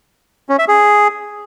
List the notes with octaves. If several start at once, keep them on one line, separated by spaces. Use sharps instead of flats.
C#4
E5
G#4